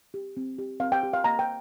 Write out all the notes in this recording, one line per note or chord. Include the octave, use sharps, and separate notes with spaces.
G4
C4
G4
C4 F5
G5
G4
F5
A#3 A#5
G5